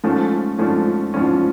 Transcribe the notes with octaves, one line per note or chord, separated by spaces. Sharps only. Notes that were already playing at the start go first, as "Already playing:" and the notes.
G#2 F3 A3 C#4
G#2 F3 A3 C#4
G#2 F3 A3 C#4